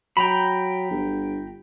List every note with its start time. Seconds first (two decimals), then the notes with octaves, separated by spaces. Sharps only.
0.17 F#3 G5 A#5 B5
0.91 G1